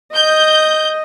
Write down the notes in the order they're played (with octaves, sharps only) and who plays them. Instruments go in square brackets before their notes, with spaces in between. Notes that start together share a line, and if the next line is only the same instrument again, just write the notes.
[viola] D#5 [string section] G6